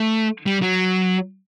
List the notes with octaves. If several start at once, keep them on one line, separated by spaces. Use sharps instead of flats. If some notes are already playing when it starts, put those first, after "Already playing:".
Already playing: A3
G3
F#3